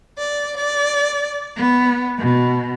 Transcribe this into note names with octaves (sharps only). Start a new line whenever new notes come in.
D5
D5
B3
B2